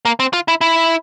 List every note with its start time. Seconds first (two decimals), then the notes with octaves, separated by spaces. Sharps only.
0.05 A#3
0.20 C4
0.33 F4
0.48 E4
0.61 E4